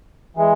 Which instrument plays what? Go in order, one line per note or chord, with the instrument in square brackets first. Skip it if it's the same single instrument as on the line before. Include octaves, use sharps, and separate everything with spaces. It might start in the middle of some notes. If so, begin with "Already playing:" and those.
[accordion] E3 G#3